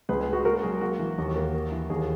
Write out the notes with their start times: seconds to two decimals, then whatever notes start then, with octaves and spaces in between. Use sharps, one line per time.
0.09 C#2 G#4 B4
0.20 G#4
0.27 G#3
0.33 F#4
0.45 A#3 F#4 A#4
0.63 F#3 G#4
0.81 A#3 F#4
0.99 E3
1.18 D#2
1.36 A#3
1.54 A#3
1.72 E3
1.90 D#2 G#4